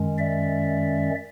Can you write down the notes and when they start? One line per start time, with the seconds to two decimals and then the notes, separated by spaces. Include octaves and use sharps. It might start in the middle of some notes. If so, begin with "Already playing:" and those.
Already playing: F#2 D#3 G#3 C#4
0.18 D5 E5